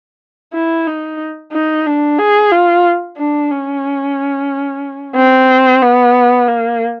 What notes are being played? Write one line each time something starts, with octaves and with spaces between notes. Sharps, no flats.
E4
D#4
D#4
D4
G#4
F4
D4
C#4
C4
B3
A#3